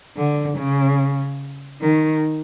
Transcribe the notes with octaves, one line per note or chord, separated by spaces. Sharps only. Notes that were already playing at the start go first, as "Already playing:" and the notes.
D3
C#3
D#3